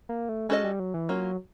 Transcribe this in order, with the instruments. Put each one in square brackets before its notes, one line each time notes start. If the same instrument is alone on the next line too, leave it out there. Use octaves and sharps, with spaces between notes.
[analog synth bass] A#3
A3
[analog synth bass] G#3 [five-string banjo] C#4 F#4 A4 C5 D#5
[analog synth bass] G3
F#3
E3
[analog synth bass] F#3 [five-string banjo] A#3 C#4 F4